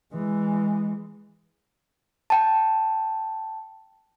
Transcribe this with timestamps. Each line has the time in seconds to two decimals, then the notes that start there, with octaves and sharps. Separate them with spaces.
0.12 E3 G#3
2.30 G5 A5